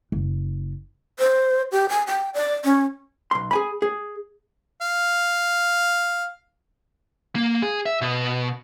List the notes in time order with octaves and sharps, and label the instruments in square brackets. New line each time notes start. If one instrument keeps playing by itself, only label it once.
[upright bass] F#1
[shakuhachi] C5
G4
G#5
G5
D5
C#4
[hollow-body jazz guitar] B1 C6
G#4 G#5 B5
G#4
[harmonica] F5
[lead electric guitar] A#3
G#4
E5
B2